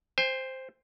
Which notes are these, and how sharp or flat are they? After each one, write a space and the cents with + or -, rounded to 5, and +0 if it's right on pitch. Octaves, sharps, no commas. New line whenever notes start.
C5 +0 G5 +45